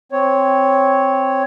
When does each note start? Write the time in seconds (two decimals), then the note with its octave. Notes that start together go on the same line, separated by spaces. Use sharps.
0.12 C4 C#5